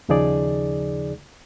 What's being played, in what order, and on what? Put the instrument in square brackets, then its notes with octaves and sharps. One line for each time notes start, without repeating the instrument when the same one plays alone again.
[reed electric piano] D#2 C#3 F3 D#4 G#4 D5